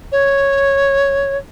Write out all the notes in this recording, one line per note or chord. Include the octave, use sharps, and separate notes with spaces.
C#5